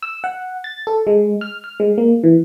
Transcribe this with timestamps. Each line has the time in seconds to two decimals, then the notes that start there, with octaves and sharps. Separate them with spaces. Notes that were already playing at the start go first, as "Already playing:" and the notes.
0.03 E6
0.24 F#5
0.64 A6
0.87 A4
1.07 G#3
1.41 F6
1.64 F6
1.80 G#3
1.98 A#3
2.24 E3